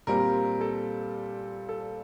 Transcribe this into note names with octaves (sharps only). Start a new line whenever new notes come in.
A#2 G3 C4 A#4
A4
A4